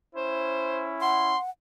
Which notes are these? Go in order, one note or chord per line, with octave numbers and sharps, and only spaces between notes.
C#4 E4 C5
F#5 C6